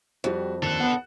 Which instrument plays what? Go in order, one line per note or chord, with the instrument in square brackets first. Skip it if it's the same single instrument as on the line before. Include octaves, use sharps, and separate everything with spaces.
[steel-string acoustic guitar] F2 [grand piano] G3 F#4
[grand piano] D#2 F#6 [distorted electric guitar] D4 A4
[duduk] B3 [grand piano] F#5